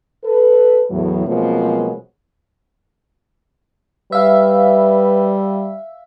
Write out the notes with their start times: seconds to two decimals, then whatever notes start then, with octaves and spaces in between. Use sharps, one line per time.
0.25 A4 B4
0.90 E2 A2 F#3
1.27 B2 F3 F#3 G#3 A#3 C4
4.12 G3 B4 E5 F5